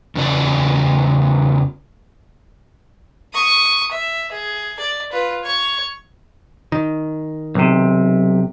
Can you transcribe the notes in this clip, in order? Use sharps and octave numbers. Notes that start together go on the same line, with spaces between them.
E2 C#3 D5
C#6 D#6
E5
G#4
D5
F4 B4
C#5 C#6
D#3
B1 C3